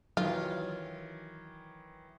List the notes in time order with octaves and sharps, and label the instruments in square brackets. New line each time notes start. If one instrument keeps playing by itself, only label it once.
[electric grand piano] D#3 E3 [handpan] F#3 [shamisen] F4